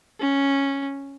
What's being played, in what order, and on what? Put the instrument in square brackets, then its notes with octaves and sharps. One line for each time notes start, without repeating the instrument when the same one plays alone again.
[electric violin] C#4